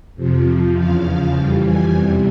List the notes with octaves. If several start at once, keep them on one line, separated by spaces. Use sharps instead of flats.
F2 C3 F3
E2 C#3 F3 F5
F2 E3 G3 G5
G#5
E2 C3 G3